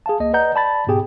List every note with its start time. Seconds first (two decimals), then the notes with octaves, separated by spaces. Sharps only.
0.06 G#4 F5 A5
0.20 C#2 A#3 D#5
0.33 B4 D5 D#5 F#5 A#5 G6
0.55 D5 A5 B5 A6
0.87 G#2 B2 B3 G4 G#4 G5